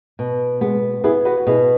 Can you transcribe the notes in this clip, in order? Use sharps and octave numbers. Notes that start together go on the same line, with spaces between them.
B2
G#3 B3
B3 E4 G#4
F#4 B4
F#4
B2 E4 G#4